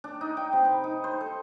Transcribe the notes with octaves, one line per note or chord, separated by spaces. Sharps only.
D4
D#4
G5
C3
B4
D#4
C5
A4